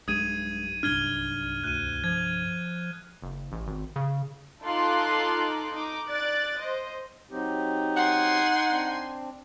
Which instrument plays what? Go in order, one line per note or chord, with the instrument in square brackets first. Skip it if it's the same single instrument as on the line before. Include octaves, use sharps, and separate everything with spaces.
[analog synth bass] B1 [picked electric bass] G2 G#3 [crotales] D#6 G#6 D#7
[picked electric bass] C2 G2 D4 [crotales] F6 G#6 G7
[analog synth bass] D2 [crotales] F#6 D#7
[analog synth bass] F3 [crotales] G#6
[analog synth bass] F#1
A1
G#1
C#3
[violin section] D#4 F4 A4 C6 D6 F#6
D#4 D6
D5 F#6 A6 D7
C5 D#5
[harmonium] F#3 C4 G4 [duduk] D#4
[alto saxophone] F#5 [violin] G#5 C6
[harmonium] C4 D4